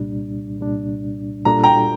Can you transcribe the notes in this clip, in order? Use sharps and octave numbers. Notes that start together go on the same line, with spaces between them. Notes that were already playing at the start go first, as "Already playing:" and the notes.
Already playing: C2 A#2 G3 D4
C2 A#2 G3 D4
A#2 G3 D4 F4 A4 A#5
G5 A#5